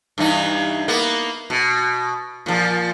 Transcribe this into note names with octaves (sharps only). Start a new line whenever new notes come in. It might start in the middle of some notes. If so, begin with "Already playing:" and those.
G2 E3 D#4
A#3 B3
B2
A#2 F3